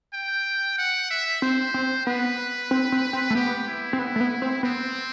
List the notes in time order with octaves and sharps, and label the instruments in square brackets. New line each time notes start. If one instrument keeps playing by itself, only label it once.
[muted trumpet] G5
F#5
E5
[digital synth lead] C4 [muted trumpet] C5
[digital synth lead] C4
[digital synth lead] B3 [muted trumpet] B4
[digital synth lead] C4
C4
C4
A3
[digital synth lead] B3 [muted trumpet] G4
[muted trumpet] E4
[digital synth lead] C4
B3
A3
B3
C4
[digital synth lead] B3 [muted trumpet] C4